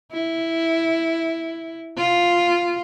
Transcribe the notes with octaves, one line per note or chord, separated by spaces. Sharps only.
E4
F4